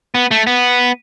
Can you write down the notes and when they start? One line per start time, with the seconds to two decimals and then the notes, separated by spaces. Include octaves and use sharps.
0.15 B3
0.31 A3
0.47 B3